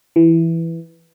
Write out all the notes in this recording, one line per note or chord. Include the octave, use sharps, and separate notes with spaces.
E3